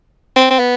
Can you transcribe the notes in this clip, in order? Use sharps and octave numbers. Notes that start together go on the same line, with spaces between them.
C4
C4
B3